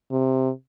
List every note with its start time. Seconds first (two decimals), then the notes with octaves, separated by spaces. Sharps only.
0.11 C3